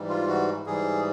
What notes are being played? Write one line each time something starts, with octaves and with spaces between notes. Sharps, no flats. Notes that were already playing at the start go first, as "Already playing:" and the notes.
Already playing: G#2 E3 G3
F4
F#4
G#2 E3 G3 G#4